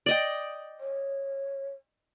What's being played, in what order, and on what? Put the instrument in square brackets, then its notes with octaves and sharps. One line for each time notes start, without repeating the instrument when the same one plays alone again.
[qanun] D5 D#5 G5
[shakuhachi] C#5